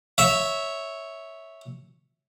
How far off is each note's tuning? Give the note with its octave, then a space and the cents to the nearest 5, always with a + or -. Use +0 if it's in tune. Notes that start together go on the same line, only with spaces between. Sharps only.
C#5 +0 E5 -10